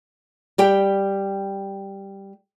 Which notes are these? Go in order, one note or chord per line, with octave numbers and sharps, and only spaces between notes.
G3 G4 G5